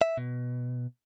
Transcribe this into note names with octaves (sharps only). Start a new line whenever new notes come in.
E5
B2